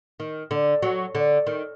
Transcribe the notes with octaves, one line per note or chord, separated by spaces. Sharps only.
D#3
D3
F#3
D3
D#3